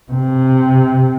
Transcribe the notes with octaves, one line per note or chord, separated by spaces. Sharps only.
C3